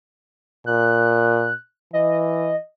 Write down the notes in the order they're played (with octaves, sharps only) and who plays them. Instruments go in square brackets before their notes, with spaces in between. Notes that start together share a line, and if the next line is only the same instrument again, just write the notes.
[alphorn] A#2 [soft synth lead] F#6
[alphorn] E3 [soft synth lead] D#5